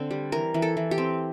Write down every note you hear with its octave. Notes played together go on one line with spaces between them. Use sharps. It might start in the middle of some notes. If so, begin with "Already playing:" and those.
Already playing: D3 C4
G3
E3 A#4
E3
A4
E3
G4
C4